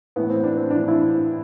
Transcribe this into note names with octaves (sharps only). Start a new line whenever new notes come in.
A2 E3 B3
C4
D4
C4
A2 E3 D4
E4